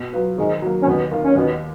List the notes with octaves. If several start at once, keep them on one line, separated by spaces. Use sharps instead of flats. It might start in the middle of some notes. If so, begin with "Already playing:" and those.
Already playing: B2
F#3 B3 F4 B4
G#2 D#3 G#3
F#3 A#3
C#4
D#2 B2 B3
D#3 A#3 F4
C#4
D#2 B2 B3